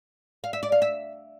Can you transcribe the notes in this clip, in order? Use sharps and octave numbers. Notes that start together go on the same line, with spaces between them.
F5
E5
D5
F5
E5